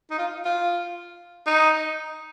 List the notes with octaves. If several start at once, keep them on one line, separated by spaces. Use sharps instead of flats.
D#4
F4
F4
D#4